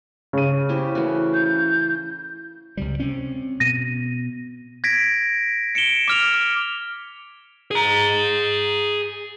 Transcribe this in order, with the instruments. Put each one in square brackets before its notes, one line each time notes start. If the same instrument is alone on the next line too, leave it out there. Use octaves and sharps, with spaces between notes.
[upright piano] C#3 D#7
[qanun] E4 G4 C5
E3 A3 F#4
[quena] G6
[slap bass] C#2 C3 G3
C3 C4 C#4
[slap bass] B2 [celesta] A#6 D#7
[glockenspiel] G#6 A#6 B6 D7
C#7 D7 E7 G7
D6 F6 F7
[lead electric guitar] G#4 A#5